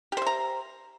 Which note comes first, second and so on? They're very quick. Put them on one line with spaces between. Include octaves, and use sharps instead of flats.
G4 C5 E5 A#5